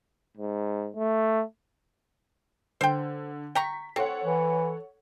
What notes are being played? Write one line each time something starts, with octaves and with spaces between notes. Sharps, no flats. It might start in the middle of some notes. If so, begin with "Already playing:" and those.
G#2
A3
D3 C5 G5
G5 A#5 C#6 B6
C4 A4 C#5 F#5
E3